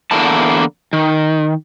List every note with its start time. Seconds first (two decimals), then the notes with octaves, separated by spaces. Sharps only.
0.11 E2 D3 A#3 E4 A5
0.93 D#3